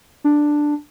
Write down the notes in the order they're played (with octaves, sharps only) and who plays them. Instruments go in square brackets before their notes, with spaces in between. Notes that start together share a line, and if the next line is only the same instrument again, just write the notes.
[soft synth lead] D4